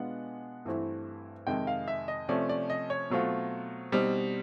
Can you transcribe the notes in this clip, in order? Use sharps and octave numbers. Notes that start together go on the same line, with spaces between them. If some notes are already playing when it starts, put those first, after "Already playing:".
Already playing: B2 G#3 B3 D4 F4 F#5
G2 E3 A3 C4 E4
F2 C3 D#3 G#3 G5
F5
E5
D#5
C3 F3 A3 C#4 D5
D5
D#5
C#5
B2 F#3 A3 C4 F4
B2 G3 C4 D#4